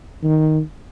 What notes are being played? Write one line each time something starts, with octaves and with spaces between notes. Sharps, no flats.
D#3